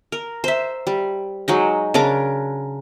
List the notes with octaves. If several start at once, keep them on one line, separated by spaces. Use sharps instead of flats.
A#4
C5 E5
G3
F#3 G#3 D#4
C#3 D4 A#4 D6